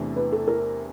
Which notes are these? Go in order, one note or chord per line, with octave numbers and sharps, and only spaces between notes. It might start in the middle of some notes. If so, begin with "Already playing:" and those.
Already playing: E2 C3 E3 A3 D4
B4
A4
A#4